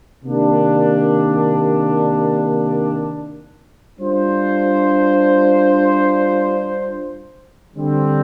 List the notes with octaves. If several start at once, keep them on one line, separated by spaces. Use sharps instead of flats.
C3 D#3 A#3 D4 G4
G3 D4 F4 C5
D3 G3 C4